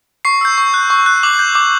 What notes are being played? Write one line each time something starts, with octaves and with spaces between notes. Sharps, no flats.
C#6 C7
E6 G6
C#6
F#6
C#6
F#6
D6 F#7
G6
D6